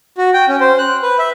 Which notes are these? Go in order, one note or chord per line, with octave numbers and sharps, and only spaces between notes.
F#4
G5
C#4
C5
F#6
B4
E5